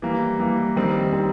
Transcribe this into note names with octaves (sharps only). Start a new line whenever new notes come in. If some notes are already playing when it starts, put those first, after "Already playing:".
E3 G3 A#3
E3 G3 A#3
D#3 G3 C4
D#3 G3 C4